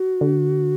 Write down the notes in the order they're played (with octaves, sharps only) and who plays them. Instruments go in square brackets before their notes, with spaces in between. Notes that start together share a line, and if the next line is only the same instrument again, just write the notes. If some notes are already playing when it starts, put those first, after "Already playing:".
Already playing: [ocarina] F#4
[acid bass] D3